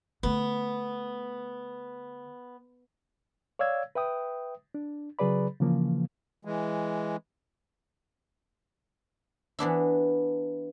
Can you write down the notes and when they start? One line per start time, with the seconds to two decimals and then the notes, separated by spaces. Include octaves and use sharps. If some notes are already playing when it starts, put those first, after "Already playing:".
0.23 D3 A3 B3
3.59 C#5 D5 F5 E6 G#6
3.95 B4 E5 G5 D#6
4.75 D4
5.19 C#3 F#3 G#4 B4 D5 B5
5.61 C#3 E3 F3 A#3
6.45 E3 G#3
9.59 E3 B3 D4 E4